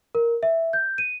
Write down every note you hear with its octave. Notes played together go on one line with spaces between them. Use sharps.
A#4
E5
G6
D#7